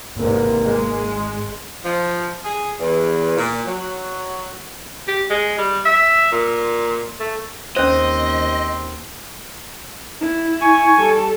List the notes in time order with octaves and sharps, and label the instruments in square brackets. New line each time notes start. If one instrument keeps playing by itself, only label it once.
[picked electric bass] G#1 [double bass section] E2 G#2 C3 [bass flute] A#3
[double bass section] G#3
[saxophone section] F3
G#4
E2
A#2
F#3
[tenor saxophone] G4
G#3
G3
E5
A#2
A3
[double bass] D#2 [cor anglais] C4 [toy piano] C#4 C5 [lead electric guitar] D#5
[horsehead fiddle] E4
[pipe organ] G#5 C#6
[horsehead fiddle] G3 A4